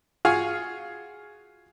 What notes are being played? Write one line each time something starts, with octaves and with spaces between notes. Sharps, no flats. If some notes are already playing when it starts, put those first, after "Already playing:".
F4 F#4 G#4 F5 G#5 C#6